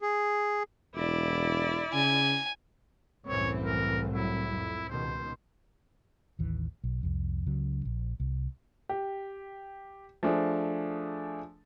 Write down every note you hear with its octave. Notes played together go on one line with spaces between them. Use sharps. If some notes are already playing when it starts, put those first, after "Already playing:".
G#4
E1 E4 D5
C#3 G#5
C2 F#2 A2 E3 C4 C#5
A#4
F#3 E4
F2
C#2 B2 D#3 C5
A1 D#2 E3
B1
C2 F2
C#2 C#3 F#3
A#1
C2
G4
F3 A3 D4 G#4